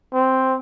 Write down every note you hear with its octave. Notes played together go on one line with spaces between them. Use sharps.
C4